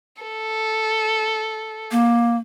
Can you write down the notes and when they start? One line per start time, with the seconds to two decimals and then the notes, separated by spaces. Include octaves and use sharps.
0.22 A4
1.91 A#3